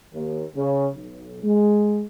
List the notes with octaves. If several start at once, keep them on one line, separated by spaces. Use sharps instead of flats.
D#2
C#3
B1
G#3